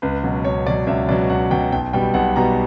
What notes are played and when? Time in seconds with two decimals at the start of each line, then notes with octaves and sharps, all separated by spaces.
0.02 C#2 B4
0.24 B2 F#3
0.45 C#2 C#5
0.66 B2 D5
0.70 F#3
0.87 C#2 E5
1.09 B2 D5
1.11 F#3
1.30 C#2 F#5
1.51 B2 F#3 G5
1.72 B1 G5
1.93 B2 G3 B3 G5
2.14 B1 F#5
2.36 B2 G3 B3 A#5